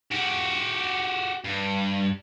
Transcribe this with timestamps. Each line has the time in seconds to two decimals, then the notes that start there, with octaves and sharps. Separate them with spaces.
0.11 F#4 G4
1.44 G2